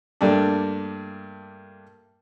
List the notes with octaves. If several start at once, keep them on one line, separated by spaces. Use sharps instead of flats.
G2 A3 A#3 D4